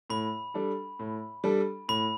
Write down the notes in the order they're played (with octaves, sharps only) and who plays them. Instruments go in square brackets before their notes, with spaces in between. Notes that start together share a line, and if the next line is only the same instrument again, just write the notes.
[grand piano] A2 [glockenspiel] B5
[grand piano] G3 D4 A4
A2
G3 D4 A4
[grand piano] A2 [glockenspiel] B5